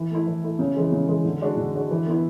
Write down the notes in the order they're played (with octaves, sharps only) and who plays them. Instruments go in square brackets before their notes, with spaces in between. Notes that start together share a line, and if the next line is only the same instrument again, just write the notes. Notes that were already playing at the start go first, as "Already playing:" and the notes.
Already playing: [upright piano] E3
A3 E4
E3
A3 E4
C#3
E3 G#3
C#3
E3 G#3
D3
G#3 D4 F#4
D3
G#3 D4 F#4
E3
B3 E4